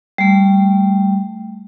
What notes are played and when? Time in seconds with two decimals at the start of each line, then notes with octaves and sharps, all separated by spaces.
0.18 G3 A3